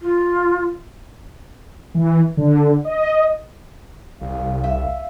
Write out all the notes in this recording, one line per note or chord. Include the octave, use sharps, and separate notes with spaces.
F4
E3
D3
D#5
C2 F5
E5